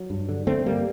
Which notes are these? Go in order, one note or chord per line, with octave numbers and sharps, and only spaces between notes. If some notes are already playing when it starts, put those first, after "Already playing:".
Already playing: F#3
G2
D3
D3 A3 C4
G2 G3 A#3